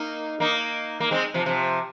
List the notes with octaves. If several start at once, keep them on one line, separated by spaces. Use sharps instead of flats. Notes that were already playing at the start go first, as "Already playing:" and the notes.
Already playing: A#3 D#4
A#3 D#4
A#3
G#3 C4
C3 F3
C3 F3